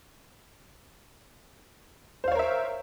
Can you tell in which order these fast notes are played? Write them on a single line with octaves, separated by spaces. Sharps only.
C5 F5 C#5 A#4 E5